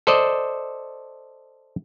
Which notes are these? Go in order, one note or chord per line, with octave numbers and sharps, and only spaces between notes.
A4 C5 D5 D#5